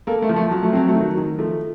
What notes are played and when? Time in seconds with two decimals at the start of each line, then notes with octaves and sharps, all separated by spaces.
0.07 A#3 A4
0.22 A3
0.29 F3
0.36 A3
0.51 F3 F#3
0.63 A3
0.73 F#3 C4
0.87 A3
0.95 D#3
1.01 F#3
1.17 D#3
1.38 F3 A3